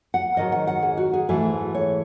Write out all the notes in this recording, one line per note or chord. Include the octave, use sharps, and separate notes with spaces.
F#5
G#2 D#3 F#3 D#5
F#5
F#5
G#4
F#4
G#4
G#2 E3 A3 G#4
C#5